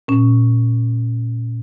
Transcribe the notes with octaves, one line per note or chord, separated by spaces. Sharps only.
A#2 C#4